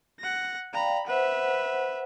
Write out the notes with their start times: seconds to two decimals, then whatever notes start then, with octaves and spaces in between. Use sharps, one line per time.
0.20 F#5 A#6
0.73 D5 F5 G5 A#5 B5
1.07 B4 C5 E5 F#5